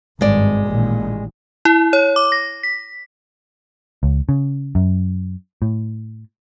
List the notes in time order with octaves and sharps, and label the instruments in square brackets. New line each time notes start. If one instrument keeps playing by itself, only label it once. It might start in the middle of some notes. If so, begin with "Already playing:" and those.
[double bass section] G#1 G2 [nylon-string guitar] G#3 D5
[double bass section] A1 A#2 D#3
[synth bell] E4
C#5
D6
A#6
B6
[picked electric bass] C#2
C#3
F#2
A2